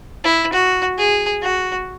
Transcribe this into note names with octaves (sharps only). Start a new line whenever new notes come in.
E4
F#4
G#4
F#4